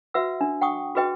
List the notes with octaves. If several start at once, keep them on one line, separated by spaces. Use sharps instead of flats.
F#4 B4 E5 F#5 E6
D4
F#5 G5 C#6 D#6
F#4 G#4 B4 D#5 G5